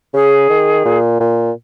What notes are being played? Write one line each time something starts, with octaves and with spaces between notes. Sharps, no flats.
C#3 G#4
D#3
A#2
A#2